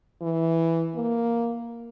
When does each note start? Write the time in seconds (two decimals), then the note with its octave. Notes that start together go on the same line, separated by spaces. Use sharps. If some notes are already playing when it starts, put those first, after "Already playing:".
0.21 E3
0.95 A#3